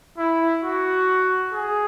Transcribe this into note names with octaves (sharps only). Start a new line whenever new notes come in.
E4
F#4
G#4